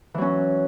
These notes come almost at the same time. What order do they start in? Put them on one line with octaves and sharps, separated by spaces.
E3 F#3 C#4